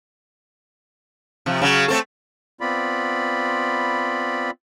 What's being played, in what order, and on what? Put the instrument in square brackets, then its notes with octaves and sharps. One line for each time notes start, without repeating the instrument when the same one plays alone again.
[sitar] C3 F3
C#3 F#3
A3 C4 A4
[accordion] B3 C4 F4 D5 B5